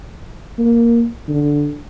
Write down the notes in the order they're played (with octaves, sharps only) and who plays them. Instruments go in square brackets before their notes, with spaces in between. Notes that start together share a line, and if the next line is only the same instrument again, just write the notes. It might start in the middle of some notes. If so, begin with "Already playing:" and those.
[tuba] A#3
D3